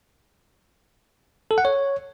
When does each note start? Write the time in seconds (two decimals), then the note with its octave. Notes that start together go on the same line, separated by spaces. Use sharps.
1.51 A4
1.58 F#5
1.65 C#5